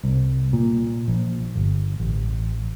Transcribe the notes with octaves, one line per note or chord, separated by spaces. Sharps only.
C2
A#2
A#1
G1
A1